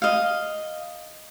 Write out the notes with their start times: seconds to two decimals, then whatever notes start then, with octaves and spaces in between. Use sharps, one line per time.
0.02 D#5 F5